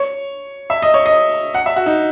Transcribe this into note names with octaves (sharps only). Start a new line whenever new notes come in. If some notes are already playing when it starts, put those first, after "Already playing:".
Already playing: C#5
E5
D#5
C#5
D#5
F#5
E5
F#4
D#4